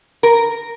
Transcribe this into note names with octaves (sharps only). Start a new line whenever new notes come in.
A#4